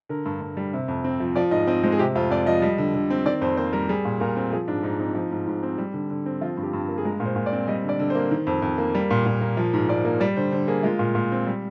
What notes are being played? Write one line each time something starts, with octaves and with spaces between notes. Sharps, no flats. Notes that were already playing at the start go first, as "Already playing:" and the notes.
D3 A#4
G2
G2
G3
C3
F2
C4
F3
F3 D5
G#2 D#5
C4 D#5
G#3 C5
G#4
C3 G4
F2 F4
F2 D5
F3 D#5
G3
D3
D3
C4
D#3 D5
F2 C5
A#3 C5
G3 A#4
G3 G#4
A#2
A#2 A#4
C4
F3 G#4
G#2 D4
G#2 D#4
C4 D#4
F3
G#2
G#2
C4
G3
D3
D3
C4
F3 F4
G2
G4
G2
A#3
G#4
G#3 A#4
A#2
C5
A#2
D5
C4
G3 D#5
D3 D5
D3
A#3 C5
D#3
F2
F2
A#3
G3
A#2
A#2
A#3
F3
G#2
G#2 D5
A#3
G3 D5
D3 C5
D3 C5
A#3 G#4
G#3 F4
A#2
A#2
C4
G3